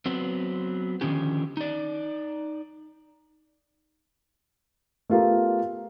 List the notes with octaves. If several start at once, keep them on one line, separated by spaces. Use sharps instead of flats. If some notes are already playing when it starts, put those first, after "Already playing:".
F#3 B3 C4
D3 D#3 F3 C#4 G4
D#4 D5
A3 B3 F4 G4 A#4